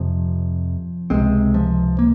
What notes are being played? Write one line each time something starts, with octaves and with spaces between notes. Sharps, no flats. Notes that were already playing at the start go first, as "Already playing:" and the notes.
Already playing: F2 C3 F3
C#2 C3 G#3 C4
F3
A#3